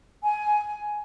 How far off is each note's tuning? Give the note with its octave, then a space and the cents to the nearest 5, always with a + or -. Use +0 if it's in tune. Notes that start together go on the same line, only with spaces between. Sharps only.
G#5 +10